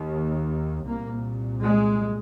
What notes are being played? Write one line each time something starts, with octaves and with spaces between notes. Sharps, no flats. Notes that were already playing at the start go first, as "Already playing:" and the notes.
Already playing: D#2
C2 A#2 A#3
G#3